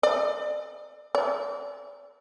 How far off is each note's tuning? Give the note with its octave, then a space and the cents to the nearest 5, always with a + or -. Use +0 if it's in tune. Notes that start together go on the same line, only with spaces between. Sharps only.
D5 +40
D5 -30